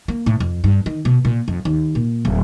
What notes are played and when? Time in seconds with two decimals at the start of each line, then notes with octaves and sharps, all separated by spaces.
0.08 A#3
0.26 A2
0.40 F2
0.64 G2
0.86 D#3
1.05 B2
1.25 A#2
1.48 F2
1.65 D#2
1.95 A#2
2.25 D1